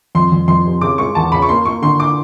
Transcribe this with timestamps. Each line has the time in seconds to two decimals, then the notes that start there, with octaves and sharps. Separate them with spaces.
0.15 F2 C6
0.32 F2
0.48 F2 C6
0.66 C3
0.81 C#3 D6
0.98 G#3 C#6
1.15 E2 A5
1.32 C#3 B5
1.42 C#6
1.49 A#3 C6
1.66 A#3 C#6
1.82 D3 C6
2.00 D6